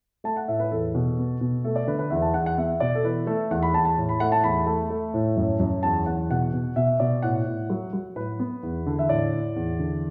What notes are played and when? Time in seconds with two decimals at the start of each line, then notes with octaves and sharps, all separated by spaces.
0.24 A3 A5
0.37 F#5
0.48 A2 E5
0.60 B4
0.71 E2 A4
0.95 B2
1.18 B3
1.41 B2
1.64 A3 A4
1.76 D5
1.87 D3 B4
1.99 B4
2.10 E2 E5
2.22 A5
2.34 E2 F#5
2.46 F#5
2.58 B3 E5
2.80 B2 D5
2.95 A4
3.04 E3 B4
3.27 A3 A4
3.51 E2 F#5
3.63 B5
3.73 E2 A5
3.85 A5
3.97 A2
4.09 B5
4.20 A3 F#5
4.32 A5
4.44 E2 B5
4.66 A3 A5
4.90 A3
5.14 A2
5.37 F#2
5.60 F#2
5.83 E2 A5
6.06 E2 F#5
6.30 B2 F#5
6.53 B2
6.76 B2 E5
7.00 B2 D5
7.22 A2 F#5
7.46 A2
7.70 F#3
7.93 F#3
8.16 A2 B4
8.40 B3
8.63 E2
8.86 D3
8.99 E5
9.09 A2 D5
9.33 A2
9.56 E2
9.79 D3